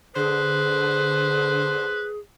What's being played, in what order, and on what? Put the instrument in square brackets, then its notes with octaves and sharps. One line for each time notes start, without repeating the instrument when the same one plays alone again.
[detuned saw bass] D3 [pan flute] G#4 [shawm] B4 [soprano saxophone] C5